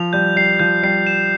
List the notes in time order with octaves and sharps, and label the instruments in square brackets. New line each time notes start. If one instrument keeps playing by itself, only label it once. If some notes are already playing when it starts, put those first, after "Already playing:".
Already playing: [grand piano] F3 [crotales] F7
[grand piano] G3 [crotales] G6
[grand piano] G3 [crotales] C7
[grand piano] F3 [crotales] G6
[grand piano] G3 [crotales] C7
[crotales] E7